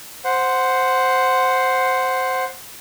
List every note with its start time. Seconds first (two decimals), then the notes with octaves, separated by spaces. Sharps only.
0.24 C5 F#5